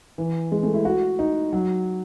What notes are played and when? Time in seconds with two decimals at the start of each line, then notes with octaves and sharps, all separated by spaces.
0.18 E3
0.52 G#3
0.63 A3
0.74 E4
0.85 F#4
1.19 D#4
1.53 F#3